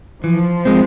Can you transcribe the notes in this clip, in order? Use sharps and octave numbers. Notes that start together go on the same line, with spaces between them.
E3 F3
G#3 C4